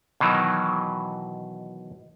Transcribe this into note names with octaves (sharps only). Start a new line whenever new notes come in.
B2 D#3 E3 F#3